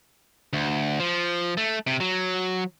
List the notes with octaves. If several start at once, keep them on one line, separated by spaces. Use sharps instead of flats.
D2
F3
A3
C3
F#3